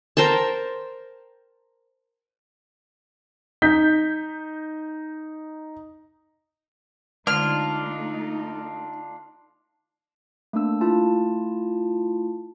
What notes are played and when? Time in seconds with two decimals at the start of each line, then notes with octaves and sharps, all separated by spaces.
0.17 A#4 C5 G5 A5
3.62 D#4 G6 B6
7.27 D3 G#3 A3 D4 D#4 F4 F6
10.53 A3 A#3 D4 E6
10.81 A3 E4 F4 A5